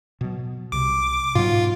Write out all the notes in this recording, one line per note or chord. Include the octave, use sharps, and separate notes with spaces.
B2 F#3
C2 C3 D6
G#2 B2 F#3 F4